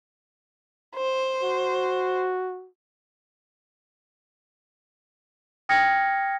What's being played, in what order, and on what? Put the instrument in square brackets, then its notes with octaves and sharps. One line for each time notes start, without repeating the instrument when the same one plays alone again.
[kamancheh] C5
[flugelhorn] F#4
[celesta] G5 D#6 F6 G#6 A#6 C#7